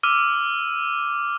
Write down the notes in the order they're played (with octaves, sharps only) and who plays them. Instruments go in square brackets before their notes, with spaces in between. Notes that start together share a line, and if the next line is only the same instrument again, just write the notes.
[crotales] D6 E6 F6 D#7